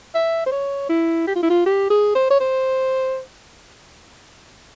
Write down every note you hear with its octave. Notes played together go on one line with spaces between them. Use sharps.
E5
C5
C#5
E4
G4
F4
E4
F4
G4
G#4
C5
C#5
C5